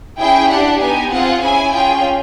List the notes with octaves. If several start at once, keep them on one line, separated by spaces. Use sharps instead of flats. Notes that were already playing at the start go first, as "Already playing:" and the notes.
C#4 E4 G#4 G5
D4 G4 F#5
B3 D#4 G4 G#5
C4 F4 G#4 F#5
C#4 E4 G#4 G#5
C#4 F4 G#4 G5